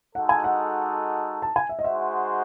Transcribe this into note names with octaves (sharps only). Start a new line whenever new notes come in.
G#3 D#4 F#4 A4 F#5
G#5
F#5
A5
G#5
E5
D#5
G#3 D#4 F#4 C5 E5 F#5